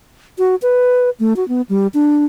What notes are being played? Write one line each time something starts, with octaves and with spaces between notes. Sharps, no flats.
F#4
B4
A3
F#4
B3
G3
D4